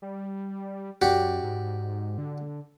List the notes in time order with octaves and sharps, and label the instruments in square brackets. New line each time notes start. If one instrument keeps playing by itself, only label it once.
[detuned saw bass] G3
[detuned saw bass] F#2 [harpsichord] F#4 G4 D5
[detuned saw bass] G#2
D3